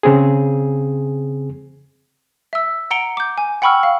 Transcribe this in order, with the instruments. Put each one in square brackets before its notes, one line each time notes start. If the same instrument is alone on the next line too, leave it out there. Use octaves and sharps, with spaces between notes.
[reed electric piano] C#3 C4 G#4
[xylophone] E5 E6
F#5 A#5 C#7 D7 G7
D6 G6
G#5
F#5 G5 B5 C#6 E6 F6
F5